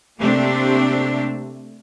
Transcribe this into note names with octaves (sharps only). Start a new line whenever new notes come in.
C3 A3 A#3 C4 D4 G4